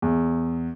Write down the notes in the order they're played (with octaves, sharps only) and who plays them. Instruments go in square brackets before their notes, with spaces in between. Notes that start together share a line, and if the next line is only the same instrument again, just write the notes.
[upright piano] E2